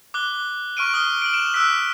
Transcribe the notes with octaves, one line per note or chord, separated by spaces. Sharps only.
D6 F#6 G7
C#6 F6 D7 D#7
D#6 F6 G7
D7 F#7
E7
E6 F#6 B6